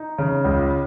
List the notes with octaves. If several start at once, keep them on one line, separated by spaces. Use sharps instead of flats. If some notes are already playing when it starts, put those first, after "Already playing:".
Already playing: D#4
C#3
C#2